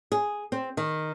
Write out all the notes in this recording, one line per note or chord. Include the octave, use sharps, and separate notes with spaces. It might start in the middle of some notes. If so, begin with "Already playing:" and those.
G#4
C4
D#3